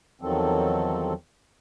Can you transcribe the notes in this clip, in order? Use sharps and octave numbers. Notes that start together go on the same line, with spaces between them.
E2 D#3 F3 F#3 C4 A4